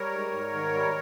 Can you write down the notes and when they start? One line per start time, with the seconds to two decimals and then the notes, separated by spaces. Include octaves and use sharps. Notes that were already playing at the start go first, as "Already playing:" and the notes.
Already playing: G3 A#4 C#5
0.11 G#2
0.33 G#2
0.53 D#3
0.73 G3